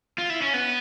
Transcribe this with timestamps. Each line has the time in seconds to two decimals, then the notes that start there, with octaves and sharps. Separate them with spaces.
0.18 F4
0.30 E4
0.42 C#4
0.54 B3